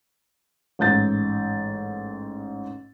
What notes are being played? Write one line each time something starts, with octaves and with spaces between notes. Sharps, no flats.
A1 G#2 G6 A6